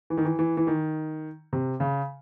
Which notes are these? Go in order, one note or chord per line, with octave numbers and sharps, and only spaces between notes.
E3
D#3
E3
E3
E3
D#3
C3
C#3